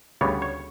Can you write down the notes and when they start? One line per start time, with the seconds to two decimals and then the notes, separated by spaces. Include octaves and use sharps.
0.21 D2 C#3 G3 B3 C#5
0.42 C#5